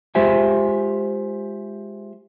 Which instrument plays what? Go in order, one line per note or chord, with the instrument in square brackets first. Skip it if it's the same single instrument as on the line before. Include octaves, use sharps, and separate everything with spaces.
[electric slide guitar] G#3 F4 G4 C5 E5 G#5